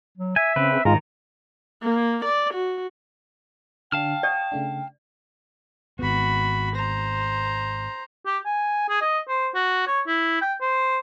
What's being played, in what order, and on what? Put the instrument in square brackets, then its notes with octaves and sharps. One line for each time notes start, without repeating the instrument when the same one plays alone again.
[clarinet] F#3
[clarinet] E5 [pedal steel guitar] G#5
[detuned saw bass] C#3 [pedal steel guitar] C4 B4
[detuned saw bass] G#2 [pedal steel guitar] D#3 [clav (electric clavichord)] G#3 F4 [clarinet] A#5
[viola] A#3
D5
F#4
[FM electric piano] D3 D4 [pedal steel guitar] F5 A5 F6 [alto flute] G5
[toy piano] D5 [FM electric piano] F#5 C#6 D#6
[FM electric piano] C#3 A3 D4
[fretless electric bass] G#1 B3 [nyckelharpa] F#4 B5
[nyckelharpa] C5 A#5
[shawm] G4
G#5
G#4
D#5
C5
F#4
C#5
E4
G5
C5